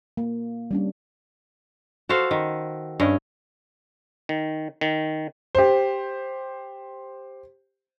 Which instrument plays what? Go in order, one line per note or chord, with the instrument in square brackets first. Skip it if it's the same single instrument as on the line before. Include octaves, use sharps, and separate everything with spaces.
[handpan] A#3
G3 C#4 D4
[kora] F#4 A4 C5 F5
D#3
G2 C#4 D#5
[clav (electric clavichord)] D#3
D#3
[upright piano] G4 C5